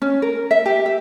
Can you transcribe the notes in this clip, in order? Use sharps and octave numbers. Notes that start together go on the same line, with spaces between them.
C#4
A#4
E5
G4
E5